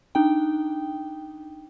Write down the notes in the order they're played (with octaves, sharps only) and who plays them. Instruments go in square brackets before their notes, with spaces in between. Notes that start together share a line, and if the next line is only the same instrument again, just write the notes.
[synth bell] D4 D#4 G5